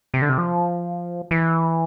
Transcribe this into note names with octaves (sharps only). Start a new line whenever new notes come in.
C3
D3
C3
F3
E3